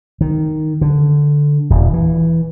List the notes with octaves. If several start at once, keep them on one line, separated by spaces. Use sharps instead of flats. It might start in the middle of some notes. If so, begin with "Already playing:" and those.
D#3
D3
D#1
E3